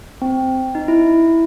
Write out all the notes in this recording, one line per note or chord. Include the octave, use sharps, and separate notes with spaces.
C4
D#4
E4